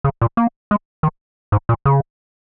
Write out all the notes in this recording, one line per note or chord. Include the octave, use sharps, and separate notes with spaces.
C#3
A#2
A#3
G#3
D#3
G#2
A#2
C#3